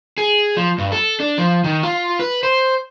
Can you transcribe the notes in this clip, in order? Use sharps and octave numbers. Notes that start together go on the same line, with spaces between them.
G#4
F3
G2
A4
D4
F3
D#3
F4
B4
C5